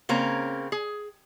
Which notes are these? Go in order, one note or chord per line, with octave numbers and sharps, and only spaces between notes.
C#3 A#3 C4 C#4 A#5
G#4